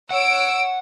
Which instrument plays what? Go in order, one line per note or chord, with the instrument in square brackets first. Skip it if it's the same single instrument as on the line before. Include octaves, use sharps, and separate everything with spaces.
[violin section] C#5 E6 D7 [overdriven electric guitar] F#5